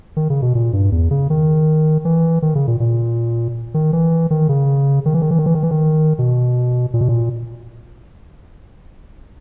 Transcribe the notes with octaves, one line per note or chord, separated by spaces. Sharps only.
D#3
C#3
B2
A#2
G2
E2
C#3
D#3
E3
D#3
C#3
A#2
A#2
D#3
E3
D#3
C#3
D#3
E3
D#3
E3
D#3
E3
D#3
E3
D#3
B2
A#2
B2
A#2